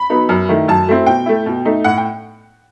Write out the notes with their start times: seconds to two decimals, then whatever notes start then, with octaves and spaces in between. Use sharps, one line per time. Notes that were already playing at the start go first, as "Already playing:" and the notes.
Already playing: B5
0.10 F#3 B3 D#4
0.29 F#2
0.49 D#3 A3 E4
0.68 F#2 A5
0.87 F#3 A3 C4 E4
1.06 B2 G5
1.26 A3 E4
1.46 B2
1.65 A3 D#4
1.84 A2 F#5
1.97 G5